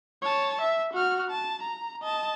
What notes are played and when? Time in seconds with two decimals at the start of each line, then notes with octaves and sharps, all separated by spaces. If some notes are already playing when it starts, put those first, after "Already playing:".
0.23 C#5 A5
0.61 E5
0.94 F#4 F6
1.31 A5
1.63 A#5
2.02 D#5 A5